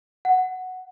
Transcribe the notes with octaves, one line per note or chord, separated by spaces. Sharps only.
F#5